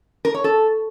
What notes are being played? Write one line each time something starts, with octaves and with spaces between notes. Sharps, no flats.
A#4
C#5
A4